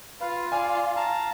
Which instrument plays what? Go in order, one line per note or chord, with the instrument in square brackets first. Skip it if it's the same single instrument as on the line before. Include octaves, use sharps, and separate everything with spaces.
[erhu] F4 [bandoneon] B4 F5
[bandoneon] D5 F5 [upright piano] G#5
[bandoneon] F5 A5 A#5